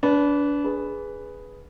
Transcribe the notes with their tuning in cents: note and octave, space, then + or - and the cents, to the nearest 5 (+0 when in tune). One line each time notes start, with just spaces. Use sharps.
D4 -30 B4 +0
G#4 +0 B4 +0